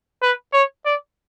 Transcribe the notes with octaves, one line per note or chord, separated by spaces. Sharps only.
B4
C#5
D5